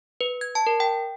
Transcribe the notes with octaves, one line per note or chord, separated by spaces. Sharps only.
B4
G#6
A5
A#4
G5